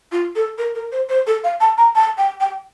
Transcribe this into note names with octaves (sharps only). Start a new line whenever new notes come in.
F4
A4
A#4
A#4
C5
C5
A4
F5
A5
A#5
A5
G5
G5